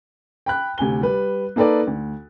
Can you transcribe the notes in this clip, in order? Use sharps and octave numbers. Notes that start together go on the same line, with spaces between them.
G5 B5 F#6
D2 C3 G#5 G7
G3 B4
A#3 D#4 A4 B4 D5
D2